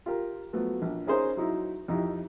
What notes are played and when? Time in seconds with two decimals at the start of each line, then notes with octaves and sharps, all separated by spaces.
0.06 F4 G4 A#4
0.53 F3 F#3 A3 B3
0.82 A#1
1.07 C#4 D#4 G#4 A#4 C5
1.37 F#3 D#4 E4
1.88 F2 D#4 E4 G4